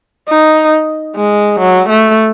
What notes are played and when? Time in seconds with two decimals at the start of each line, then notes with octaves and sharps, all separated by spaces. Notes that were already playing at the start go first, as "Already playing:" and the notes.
0.29 D#4
1.16 G#3
1.60 F#3
1.89 A3